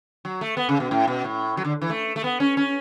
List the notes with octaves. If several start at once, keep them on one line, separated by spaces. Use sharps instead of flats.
F#3
A3
B3
C#3
B2
A2
B2
A2
F#3
D3
E3
A3
A3
B3
C#4
C#4